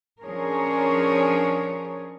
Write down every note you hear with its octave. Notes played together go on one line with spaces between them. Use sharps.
F3 C#4 D4 G#4 A#4 C#5